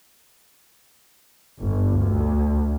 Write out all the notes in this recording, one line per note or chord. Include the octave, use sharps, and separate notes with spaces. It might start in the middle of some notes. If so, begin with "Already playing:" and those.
G1
D2